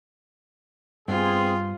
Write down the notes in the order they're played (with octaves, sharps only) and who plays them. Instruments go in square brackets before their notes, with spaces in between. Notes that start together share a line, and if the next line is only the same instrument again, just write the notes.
[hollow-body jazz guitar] G2 [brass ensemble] B3 C4 G#4 [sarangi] F4